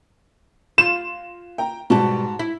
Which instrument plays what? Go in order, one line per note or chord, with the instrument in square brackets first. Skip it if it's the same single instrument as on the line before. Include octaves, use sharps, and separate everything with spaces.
[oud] F4 [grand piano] E7
[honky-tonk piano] G5 A#5
[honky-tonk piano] G#2 F#4 A5 [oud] B2 G3
[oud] E4